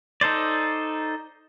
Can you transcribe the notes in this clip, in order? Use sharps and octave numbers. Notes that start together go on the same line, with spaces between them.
D#4 A4 C5 D5